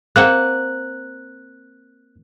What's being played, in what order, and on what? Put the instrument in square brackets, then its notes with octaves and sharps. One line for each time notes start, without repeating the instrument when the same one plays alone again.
[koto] A#3 C4 F#5 [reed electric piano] F#6